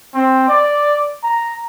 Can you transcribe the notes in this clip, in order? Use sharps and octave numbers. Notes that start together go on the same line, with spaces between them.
C4
D5
A#5